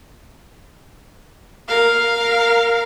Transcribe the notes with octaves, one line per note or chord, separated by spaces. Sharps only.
A#4 F5